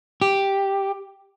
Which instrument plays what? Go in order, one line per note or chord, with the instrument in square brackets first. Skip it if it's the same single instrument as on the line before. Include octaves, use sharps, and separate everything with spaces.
[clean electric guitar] G4